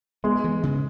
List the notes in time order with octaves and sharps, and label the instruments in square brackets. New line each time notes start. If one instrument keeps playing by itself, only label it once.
[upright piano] G#3 [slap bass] B3
[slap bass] E3
C#3